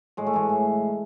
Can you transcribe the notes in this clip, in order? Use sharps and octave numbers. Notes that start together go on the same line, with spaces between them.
A2 G#3
A3
E3 G#3
A2